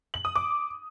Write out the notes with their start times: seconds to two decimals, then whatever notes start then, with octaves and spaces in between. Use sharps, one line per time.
0.14 F#7
0.25 D#6
0.36 D6